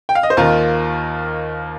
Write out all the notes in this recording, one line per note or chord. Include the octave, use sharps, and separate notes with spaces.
G5
F5
D#5
C5
D#2 D#3 F4 A#4